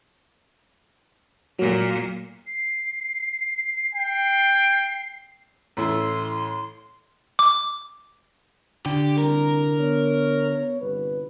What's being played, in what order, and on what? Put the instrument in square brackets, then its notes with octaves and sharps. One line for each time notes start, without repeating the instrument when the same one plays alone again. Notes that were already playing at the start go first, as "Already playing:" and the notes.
[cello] A#2 A#3 [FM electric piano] F#3
[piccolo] C7
[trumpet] G5
[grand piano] A1 [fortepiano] A3 E4 [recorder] C6
[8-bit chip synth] D6
[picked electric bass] D3 [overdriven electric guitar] G4
[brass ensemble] C2 [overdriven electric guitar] A#4
[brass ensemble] B3 C#5
G1 C2 B4